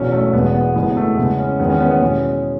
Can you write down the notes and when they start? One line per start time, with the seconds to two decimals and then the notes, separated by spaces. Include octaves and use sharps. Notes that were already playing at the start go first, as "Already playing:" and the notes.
Already playing: E1 E2 B2 F#3 C#4
0.12 A3
0.33 E1 E2 B2 G#3 B3
0.54 B3
0.75 F#1 F#2 E3 G#3 B3
0.91 B3
0.97 A3
1.17 E2 C#3 G#3 B3
1.39 C#4
1.60 E2 D#3 G#3 B3
1.70 C#4
1.80 B3
1.91 B3
2.02 E2 B2 G#3 C#4